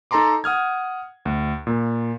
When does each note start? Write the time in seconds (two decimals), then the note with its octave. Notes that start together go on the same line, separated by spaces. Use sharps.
0.11 D#4 A4 A5 A#5 C6 D6
0.44 F#5 D#6 F6 G#6
1.25 D2
1.67 A#2